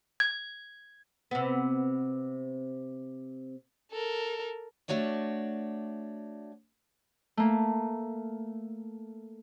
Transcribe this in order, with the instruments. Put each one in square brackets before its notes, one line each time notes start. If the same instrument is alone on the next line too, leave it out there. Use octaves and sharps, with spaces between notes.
[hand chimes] G#6
[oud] C3 B3
[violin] A4 A#4
[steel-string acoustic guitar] A3 D4 F#4 C#5 D5
[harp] A3 A#3